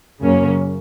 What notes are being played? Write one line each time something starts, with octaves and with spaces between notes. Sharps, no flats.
F#2 C#3 F#3 A#3 C#4